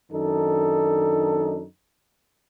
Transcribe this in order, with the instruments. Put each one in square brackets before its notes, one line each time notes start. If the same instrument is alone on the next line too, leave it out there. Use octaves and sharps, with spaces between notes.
[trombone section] F#2 D#3 D4 D#4 A4